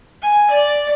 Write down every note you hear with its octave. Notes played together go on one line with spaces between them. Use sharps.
G#5
D5